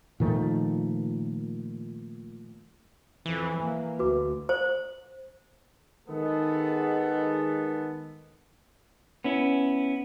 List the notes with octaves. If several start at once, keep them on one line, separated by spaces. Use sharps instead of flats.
A#2 D#3 F3 A3
F2 E3
A#3
D2 F#4 B4 D6
C5
D#3 G#3 B3 A4
B3 C#4 E4